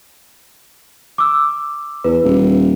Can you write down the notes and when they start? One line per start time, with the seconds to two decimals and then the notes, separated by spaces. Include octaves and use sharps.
1.18 D6 E6
2.04 E2 B4
2.24 D#1